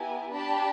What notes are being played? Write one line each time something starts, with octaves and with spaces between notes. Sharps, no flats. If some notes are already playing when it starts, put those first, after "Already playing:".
Already playing: B3 E4 G4 G#5 A#5
D4 G4 A5 B5